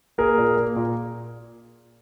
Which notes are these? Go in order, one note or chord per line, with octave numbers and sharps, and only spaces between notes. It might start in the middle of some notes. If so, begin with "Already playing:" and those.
A#3 G#4 A#4
A#2
A#3
A#2